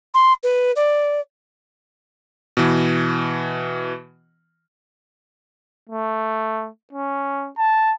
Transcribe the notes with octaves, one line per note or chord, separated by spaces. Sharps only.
C6
B4
D5
B2 E3
A3
C#4
A5